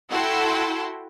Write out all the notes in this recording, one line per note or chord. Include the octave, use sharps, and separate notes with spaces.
E4 F#4 A4 F#5 G5 C6